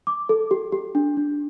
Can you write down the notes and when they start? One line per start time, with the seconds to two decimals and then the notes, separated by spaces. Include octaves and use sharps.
0.07 D6
0.29 A4
0.51 G4
0.72 G4
0.95 D4
1.17 D4